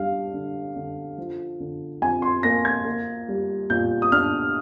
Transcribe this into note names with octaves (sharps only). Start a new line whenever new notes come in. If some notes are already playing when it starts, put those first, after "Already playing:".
Already playing: G3 D4 F5
D3
D3
F3
D3
F2 G#5
C6
A#3 A#6
G#6
A#3
G3
A#2 G6
D#6
D4 F6